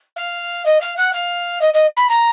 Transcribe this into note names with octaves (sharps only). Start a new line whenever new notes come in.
F5
D#5
F5
F#5
F5
D#5
D#5
B5
A#5